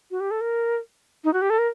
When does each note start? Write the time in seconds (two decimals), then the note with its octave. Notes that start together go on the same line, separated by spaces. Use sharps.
0.11 F#4
0.20 G4
0.31 A4
0.41 A#4
1.24 D#4
1.33 F#4
1.42 G4
1.50 A4
1.59 A#4